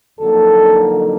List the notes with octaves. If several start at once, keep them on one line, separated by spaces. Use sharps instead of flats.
F2 D3 F#3 A#3 D#4 A4